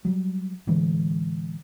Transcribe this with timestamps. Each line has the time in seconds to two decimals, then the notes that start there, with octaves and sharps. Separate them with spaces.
0.05 F#3 G3
0.67 A2 D3 E3 G#3